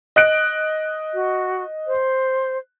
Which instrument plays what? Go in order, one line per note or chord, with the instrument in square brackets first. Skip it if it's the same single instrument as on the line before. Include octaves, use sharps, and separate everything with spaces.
[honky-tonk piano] D#5 F#6 D7
[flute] F#4
C5